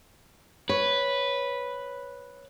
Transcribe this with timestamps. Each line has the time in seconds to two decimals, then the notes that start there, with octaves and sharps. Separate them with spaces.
0.69 B4 C#5